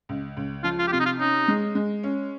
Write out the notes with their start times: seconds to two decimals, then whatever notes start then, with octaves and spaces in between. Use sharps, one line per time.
0.09 C#2
0.37 C#2
0.64 F3 F4
0.79 F4
0.88 G4
0.92 C3 F4
1.00 D#4
1.06 F4
1.19 C#4 D#4
1.48 G#3
1.75 G#3
2.03 C#4